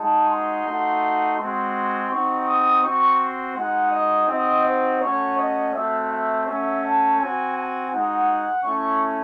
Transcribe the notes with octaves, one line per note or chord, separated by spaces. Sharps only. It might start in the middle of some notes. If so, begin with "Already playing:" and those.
Already playing: G#3 D#4 F#4 A5
C6
A3 D#4 F#4
G#3 C4 F#4 C6
C4 D#4 F#4 C#6
D#6
C4 F#4 C#6
C6
G#3 D#4 F#4 F#5
D#5
C4 D#4 F#4 D#5
C5
A3 C#4 F#4 C#5
D#5
A3 C4 F#4 E5
E5
A3 C#4 F#4 E5
A5
C4 F#4 G#5
G#5
G#3 D#4 F#4 F#5
A3 C#4 E4 C#6